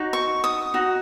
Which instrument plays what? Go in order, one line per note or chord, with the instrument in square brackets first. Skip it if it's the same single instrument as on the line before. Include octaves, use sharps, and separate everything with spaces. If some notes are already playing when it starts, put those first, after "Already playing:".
Already playing: [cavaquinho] D#4 F#4 C#5
C#6
D#6
D#4 F#4